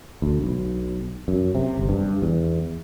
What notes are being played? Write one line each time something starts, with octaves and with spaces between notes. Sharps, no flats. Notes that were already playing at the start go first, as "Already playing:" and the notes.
D2
B1
F#2
C3
G1
G2
E2